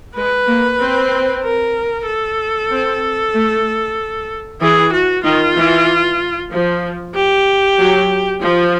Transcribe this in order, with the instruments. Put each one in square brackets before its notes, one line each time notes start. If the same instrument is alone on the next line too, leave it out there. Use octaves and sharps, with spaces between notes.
[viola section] G#3 [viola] B4
[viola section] A#3
C4
[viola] A#4
A4
[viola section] C4
A3
[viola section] E3 [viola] G#4
[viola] F#4
[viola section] D#3 [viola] F4
[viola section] E3
F3
[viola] G4
[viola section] F#3
F3